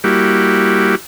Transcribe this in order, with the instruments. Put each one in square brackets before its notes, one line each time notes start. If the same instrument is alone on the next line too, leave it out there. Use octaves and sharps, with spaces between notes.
[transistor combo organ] G3 A#3 E4 F#4 G4